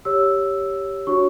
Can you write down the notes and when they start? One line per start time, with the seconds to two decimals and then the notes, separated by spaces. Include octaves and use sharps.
0.05 G4 C#5 E6
1.07 D4 F#4 C#5 C#6